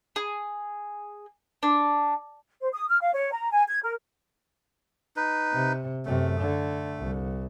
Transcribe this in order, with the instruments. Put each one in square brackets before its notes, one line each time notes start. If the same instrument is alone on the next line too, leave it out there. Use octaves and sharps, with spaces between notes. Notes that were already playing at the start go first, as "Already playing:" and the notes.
[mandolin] G#4
D4
[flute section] C5
D#6
F6
F5
C#5
A#5
G#5
G#6
A#4
[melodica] D#4 B4
[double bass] C3
[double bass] F#2 C3 [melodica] A3
[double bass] D3
C2